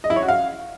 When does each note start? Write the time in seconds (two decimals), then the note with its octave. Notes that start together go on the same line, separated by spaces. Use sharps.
0.04 D#5
0.10 E4
0.16 C#5
0.22 F#4
0.28 F5